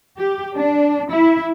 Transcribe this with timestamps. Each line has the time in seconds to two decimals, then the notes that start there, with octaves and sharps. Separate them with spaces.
0.17 G4
0.55 D4
1.08 E4